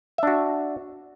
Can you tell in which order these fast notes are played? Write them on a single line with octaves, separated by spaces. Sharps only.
E5 D4 F#4